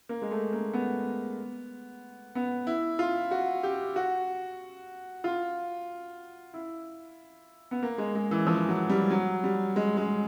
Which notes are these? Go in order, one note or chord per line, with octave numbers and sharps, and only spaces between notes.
A#3
G#3
A3
A#3
B3
B3
E4
F4
F#4
G4
F#4
F4
E4
B3
A#3
G#3
G#3
E3
F3
F#3
G3
F#3
G3
G#3
G#3